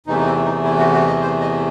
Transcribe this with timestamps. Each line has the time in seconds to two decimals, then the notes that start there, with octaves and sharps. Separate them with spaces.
0.07 E2 C3 E3 A3 D#4
0.17 D#4
0.25 C4
0.45 D#4
0.64 E4
0.78 F#4
0.92 F#4
1.07 D#5
1.21 C5
1.40 D#5